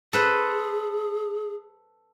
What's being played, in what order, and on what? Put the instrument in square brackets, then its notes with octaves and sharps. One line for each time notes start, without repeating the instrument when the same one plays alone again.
[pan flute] G#4 [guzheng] A4 B4 C5